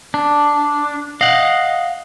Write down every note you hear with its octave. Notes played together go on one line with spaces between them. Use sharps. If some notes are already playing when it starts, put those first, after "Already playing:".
D4
D#5 F5 F#5